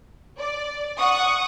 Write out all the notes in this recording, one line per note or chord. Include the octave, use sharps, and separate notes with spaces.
D5
F#5 C#6 D#6